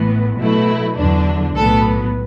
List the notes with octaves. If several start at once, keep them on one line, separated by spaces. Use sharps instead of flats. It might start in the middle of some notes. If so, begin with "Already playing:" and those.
Already playing: A1 A2 E3 B3
B2 F#3 A3 E4
E2 D3 F#3 D4
B1 A2 F#3 B3 A4